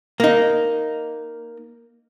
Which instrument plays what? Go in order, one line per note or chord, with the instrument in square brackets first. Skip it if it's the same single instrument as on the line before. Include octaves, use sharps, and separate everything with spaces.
[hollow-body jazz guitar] A#3 D#4